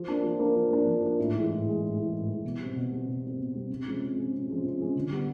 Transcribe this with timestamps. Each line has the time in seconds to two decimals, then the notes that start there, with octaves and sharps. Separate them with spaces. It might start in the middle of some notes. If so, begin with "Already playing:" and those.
Already playing: F3
0.08 A#3 D4
0.24 F3
0.39 A#3 D4
0.55 F3
0.71 A#3 D4
0.86 F3
1.02 A#3 D4
1.18 A2
1.34 E3 G#3
1.50 A2
1.66 E3 G#3
1.81 A2
1.97 E3 G#3
2.12 A2
2.28 E3 G#3
2.44 B2
2.59 G3 C4
2.75 B2
2.91 G3 C4
3.07 B2
3.22 G3 C4
3.38 B2
3.54 G3 C4
3.70 C3
3.85 F3 G#3 C#4
4.01 C3
4.17 F3 G#3 C#4
4.32 C3
4.48 F3 G#3 C#4
4.64 C3
4.79 F3 G#3 C#4
4.95 D3
5.11 G3 B3